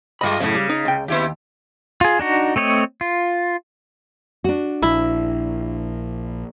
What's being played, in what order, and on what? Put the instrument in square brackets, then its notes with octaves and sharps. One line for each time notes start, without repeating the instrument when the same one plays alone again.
[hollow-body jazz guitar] G2 B5 [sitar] G#3 F4 D#5
[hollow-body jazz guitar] F#2 A2 [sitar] C#3
[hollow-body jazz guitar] G3
D#4
C#2 G5
[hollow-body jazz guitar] D#2 [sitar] B3 E4 G4
[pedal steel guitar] F4 G#4
D4 D#4 F#4
A3 C4 C#5 D#5
F4
[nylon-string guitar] D4 F#4
[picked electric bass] A#1 [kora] E4